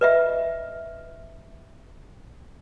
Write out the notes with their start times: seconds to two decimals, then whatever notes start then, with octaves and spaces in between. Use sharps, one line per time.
0.01 B4 D#5 E5